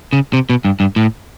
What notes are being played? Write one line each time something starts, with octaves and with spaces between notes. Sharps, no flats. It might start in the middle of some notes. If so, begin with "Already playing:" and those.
C#3
C3
B2
G2
G2
A2